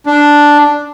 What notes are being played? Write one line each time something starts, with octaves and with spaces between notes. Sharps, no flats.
D4